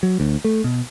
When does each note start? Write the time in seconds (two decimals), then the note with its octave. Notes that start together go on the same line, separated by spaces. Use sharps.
0.03 F#3
0.20 D2
0.45 A3
0.64 B2